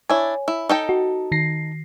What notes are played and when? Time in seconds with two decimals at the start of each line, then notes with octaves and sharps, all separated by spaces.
0.09 D4 E4 C#5 G#5
0.48 E4
0.69 D#4 A4 G5
0.89 F#4
1.32 D#3 A#6 C7